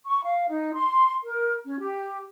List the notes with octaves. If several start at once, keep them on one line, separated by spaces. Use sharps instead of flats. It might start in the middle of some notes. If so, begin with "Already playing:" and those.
C#6
F5
D#4
C6
A#4
C#4
G4